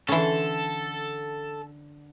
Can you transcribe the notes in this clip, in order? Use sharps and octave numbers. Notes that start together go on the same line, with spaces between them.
D3 E3 C#4 A4 C6